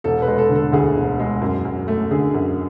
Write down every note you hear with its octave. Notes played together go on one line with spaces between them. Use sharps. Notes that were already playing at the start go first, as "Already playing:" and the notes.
E1 A4
B4
G#3
A4
D3
A4
D2 G#4
E1
G#3
F#2
F#2
A3
D3 G#4
F#2